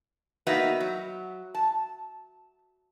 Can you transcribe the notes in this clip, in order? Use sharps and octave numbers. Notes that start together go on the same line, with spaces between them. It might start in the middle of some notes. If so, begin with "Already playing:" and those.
A#3 B3 D#4 F#4 B4 E5
F#3
A5